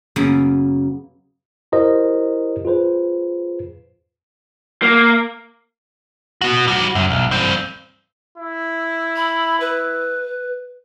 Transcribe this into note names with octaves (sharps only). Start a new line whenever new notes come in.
F#2 C#3 A#3 B3
E4 G4 A#4 C5 D#5
F4 G#4 B4 C5
A#3
B3 F#4
G3 F#4
F#2
B1
G2 C4
E4
B5
B4